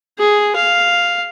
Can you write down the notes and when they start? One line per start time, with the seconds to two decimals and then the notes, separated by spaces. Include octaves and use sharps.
0.19 G#4
0.56 F5